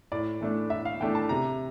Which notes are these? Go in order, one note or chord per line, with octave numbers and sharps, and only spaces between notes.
A2 D5
E3 A3 D4
A2 E5
F5
E3 A3 D4 G5
A5
C3 A#5